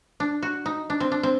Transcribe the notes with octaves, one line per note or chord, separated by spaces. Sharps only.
D4
F#4
D#4
D4
C4
D4
C4